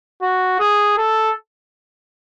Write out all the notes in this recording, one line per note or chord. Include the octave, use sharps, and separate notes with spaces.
F#4
G#4
A4